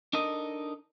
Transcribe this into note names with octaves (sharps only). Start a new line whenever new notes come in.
D4 D#4 A4 A#4 D#5